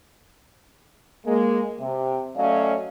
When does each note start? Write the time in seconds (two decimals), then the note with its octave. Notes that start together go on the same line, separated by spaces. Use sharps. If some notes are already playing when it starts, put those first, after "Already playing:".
1.26 G#3 A#3
1.80 C3
2.37 F#3 A3 C#4 D5 D#5 F5